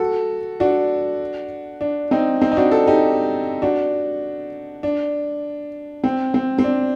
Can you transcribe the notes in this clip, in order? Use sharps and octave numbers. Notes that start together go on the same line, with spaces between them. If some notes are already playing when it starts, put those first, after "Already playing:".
Already playing: F#4 A4
D4 F#4
D4
C4 D#4
C4 D#4
D#4
D4 F#4
F#4 A4
D#4 G4
D4 F#4
D4
C4
C4
C4
D4